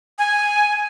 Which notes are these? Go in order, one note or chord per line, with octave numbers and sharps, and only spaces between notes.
G#5